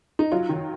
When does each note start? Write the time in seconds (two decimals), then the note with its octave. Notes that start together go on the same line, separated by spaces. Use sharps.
0.19 D#4
0.32 F#3 F4
0.49 D#3